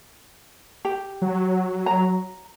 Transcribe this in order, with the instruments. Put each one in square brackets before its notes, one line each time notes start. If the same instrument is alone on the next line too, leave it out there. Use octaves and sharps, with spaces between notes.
[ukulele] G4
[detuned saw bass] F#3
[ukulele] A#5